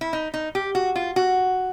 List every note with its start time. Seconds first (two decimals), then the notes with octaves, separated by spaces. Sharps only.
0.01 E4
0.13 D#4
0.34 D#4
0.55 G4
0.75 F#4
0.95 F4
1.16 F#4